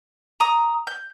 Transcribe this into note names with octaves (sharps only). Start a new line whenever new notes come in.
A#5 D#6
G6